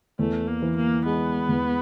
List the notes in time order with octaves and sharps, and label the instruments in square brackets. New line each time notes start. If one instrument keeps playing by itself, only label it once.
[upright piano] E2 [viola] A3
[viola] A#3
[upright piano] E3
[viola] A#3
[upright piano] G#3 [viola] B3
[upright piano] E2